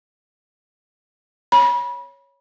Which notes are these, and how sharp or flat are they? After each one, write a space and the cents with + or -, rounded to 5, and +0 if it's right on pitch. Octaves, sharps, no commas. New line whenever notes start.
C#5 +0 B5 -30